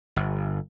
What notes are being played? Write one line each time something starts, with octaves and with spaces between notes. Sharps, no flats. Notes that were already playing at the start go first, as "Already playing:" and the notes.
G1